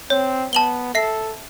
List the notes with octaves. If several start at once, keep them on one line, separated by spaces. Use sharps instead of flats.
C4 C#5
B3 A5 F#7 G7
A4 E5 C7